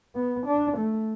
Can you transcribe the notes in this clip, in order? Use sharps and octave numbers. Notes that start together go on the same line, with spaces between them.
B3
D4
A3